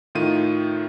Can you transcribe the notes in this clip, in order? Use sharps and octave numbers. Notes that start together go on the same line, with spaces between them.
A2 D#3 F4 D#7